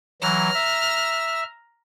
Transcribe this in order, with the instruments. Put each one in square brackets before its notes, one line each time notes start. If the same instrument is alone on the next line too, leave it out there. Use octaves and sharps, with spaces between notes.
[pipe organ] E3 F#3 [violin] A#5 F6
[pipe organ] E5